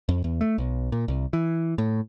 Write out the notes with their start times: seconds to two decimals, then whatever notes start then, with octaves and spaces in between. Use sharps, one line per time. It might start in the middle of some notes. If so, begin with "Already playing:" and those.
0.09 F2
0.24 E2
0.41 A3
0.58 B1
0.92 A#2
1.08 C2
1.33 E3
1.78 A2